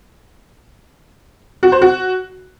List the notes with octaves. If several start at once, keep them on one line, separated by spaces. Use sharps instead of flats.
F#4
C5
F#4